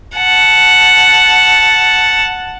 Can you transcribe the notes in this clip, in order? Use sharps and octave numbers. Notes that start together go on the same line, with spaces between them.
F#5 A5